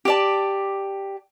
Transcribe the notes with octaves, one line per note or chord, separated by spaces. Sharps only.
G4 D5 A5